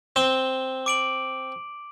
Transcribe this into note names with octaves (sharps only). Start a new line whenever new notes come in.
C4 E7 G7
D6 D7 F#7